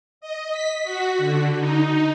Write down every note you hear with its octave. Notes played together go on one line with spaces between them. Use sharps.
D#5
B6
F#4
D3
D#4